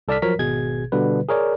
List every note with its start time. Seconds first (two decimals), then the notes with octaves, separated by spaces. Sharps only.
0.08 C2 A4 D5 A5 F6 B6
0.22 F3 F#3 A#4 C#5 A#5 B6
0.39 G#1 B2 G#4 G#6
0.92 B2 D3 G3 B4
1.29 G#4 A#4 C#5 D5